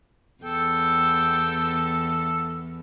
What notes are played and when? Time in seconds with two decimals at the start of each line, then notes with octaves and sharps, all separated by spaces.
0.44 E2 A4 G5